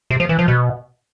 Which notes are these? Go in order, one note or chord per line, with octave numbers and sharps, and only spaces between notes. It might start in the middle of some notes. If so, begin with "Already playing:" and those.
C3
F3
E3
F3
B2